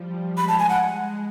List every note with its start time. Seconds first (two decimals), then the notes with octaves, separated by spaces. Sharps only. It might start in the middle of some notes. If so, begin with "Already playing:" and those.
Already playing: F3 G3
0.37 G#3 B5
0.48 A5
0.59 G#5
0.69 F#5